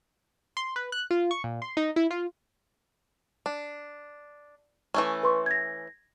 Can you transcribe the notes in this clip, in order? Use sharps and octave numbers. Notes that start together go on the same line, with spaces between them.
C6
B4
F#6
F4
C#6
A#2
C6
D#4
E4
F4
D4
E3 A3 C#4
B4 C6 C#6
G#6 A#6